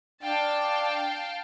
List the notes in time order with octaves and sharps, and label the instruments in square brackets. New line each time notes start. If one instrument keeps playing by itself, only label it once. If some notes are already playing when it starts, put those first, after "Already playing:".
[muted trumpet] D4 [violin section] F5 G5 A5